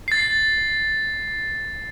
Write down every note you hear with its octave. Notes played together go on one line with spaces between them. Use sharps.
A6 C7